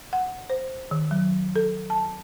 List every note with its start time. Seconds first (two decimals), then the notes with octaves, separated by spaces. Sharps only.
0.13 F#5
0.50 C5
0.91 D#3
1.11 F#3
1.56 A4
1.90 A5